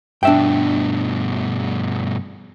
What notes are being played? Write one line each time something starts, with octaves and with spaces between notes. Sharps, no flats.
G2 B2 D4 E5 G5